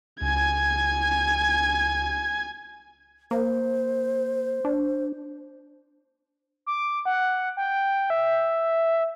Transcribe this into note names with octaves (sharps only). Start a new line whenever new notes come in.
C#2 G#5 G#6
A#3 C5
D4
D6
F#5
G5
E5